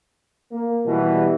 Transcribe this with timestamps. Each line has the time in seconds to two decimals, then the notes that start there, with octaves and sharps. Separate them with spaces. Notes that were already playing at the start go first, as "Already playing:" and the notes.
0.52 A#3
0.85 B2 E3 G3